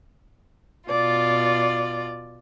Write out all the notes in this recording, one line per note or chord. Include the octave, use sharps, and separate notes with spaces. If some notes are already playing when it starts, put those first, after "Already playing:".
B2 F4 D5